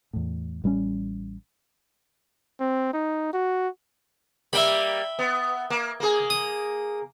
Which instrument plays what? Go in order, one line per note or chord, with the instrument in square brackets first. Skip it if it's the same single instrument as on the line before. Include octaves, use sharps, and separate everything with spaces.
[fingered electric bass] E2 A2
A1 G3 B3 C#4
[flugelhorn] C4
D#4
F#4
[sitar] G3 A#3 [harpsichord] E5 G5 B5
[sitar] B3
A#3
A#3 G#4
[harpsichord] D#6